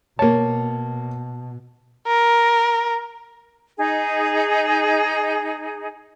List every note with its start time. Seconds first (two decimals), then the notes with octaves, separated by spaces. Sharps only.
0.19 B2 A#3 C#5 A5
2.07 A#4
3.78 D#4 G#4